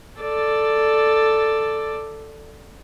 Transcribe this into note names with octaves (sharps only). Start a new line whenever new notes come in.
A4 D5